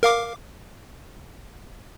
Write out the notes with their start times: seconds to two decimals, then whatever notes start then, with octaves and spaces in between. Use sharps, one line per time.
0.03 A#4 F5 D6